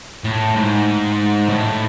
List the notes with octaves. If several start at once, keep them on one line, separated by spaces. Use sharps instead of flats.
A2
G#2
A2